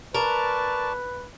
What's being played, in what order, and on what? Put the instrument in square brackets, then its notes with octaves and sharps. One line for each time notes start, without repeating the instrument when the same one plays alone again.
[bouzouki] A#4 [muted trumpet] B4 [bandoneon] D5 A5 C#6